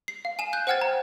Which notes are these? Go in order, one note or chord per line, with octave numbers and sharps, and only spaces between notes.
C7
F5
G#5 E7
F#6 G6
C5 F#5 G5 F6 G#6 A6
A#5